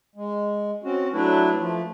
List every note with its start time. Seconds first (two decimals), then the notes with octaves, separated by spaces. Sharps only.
0.15 G#3
0.84 C4 C#4 F#4
1.13 F#3 A3 D4 E4 B4
1.58 F3 A3